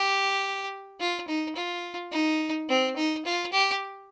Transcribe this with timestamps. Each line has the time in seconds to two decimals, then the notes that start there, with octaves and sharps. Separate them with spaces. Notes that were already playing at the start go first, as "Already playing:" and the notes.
Already playing: G4
1.00 F4
1.28 D#4
1.56 F4
2.12 D#4
2.69 C4
2.96 D#4
3.25 F4
3.53 G4